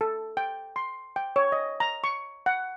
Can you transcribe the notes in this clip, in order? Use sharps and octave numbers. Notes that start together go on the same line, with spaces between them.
A4
G5
C6
G5
C#5
D#5
A#5
C#6
F#5